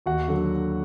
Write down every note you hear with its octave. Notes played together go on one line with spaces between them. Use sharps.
D#2 F#4 F#5
D3 F#3